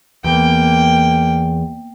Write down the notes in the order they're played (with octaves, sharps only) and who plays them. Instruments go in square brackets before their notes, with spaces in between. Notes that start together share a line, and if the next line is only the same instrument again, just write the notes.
[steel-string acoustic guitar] E2 [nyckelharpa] A#3 G5